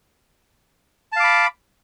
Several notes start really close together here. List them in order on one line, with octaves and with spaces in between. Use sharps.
A5 F5 D6 B5